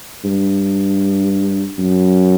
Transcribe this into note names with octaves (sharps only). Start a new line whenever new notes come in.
G2
F#2